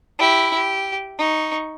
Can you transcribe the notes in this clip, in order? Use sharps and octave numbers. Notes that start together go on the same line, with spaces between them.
E4 G4
G4
D#4 C#6